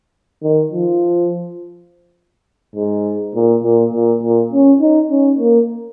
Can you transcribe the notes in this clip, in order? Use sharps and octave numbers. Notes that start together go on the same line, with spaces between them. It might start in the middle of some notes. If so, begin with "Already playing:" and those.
D#3
F3
G#2
A#2
A#2
A#2
A#2
C#4
D#4
C#4
A#3